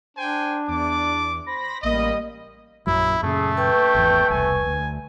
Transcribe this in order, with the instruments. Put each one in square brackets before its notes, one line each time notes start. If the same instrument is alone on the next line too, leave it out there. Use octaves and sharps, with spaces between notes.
[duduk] D4 [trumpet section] C5 G5 G#5
[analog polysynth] E2 [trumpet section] D5 D6
[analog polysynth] C5 B5 A#6
[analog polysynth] A1 A#3 B5 [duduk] G3 [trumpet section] D#5
[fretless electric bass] A#1 F#2 F#3 [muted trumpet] E4
[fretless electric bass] F#2 A#2 C#3 [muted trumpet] A3 [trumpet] G#4
[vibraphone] B4 C#6 [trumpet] G5
[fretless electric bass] G#1 E2
[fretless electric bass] E1 C2 [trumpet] G#5
[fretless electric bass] D2